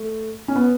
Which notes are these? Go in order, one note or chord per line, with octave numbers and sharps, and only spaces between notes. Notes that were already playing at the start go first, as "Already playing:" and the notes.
Already playing: A3
C#4
B3